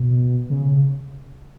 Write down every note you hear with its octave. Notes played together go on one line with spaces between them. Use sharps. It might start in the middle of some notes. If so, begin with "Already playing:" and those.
Already playing: B2
C#3